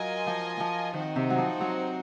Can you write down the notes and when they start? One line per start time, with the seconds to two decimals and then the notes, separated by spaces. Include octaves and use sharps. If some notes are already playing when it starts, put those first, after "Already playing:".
Already playing: F#3 F4 A#4 D#5 G#5
0.27 F3
0.60 F3
0.93 D#3 C4 D#4 F#4 C5 F#5
1.16 C3
1.30 F#3
1.38 F3
1.61 F#3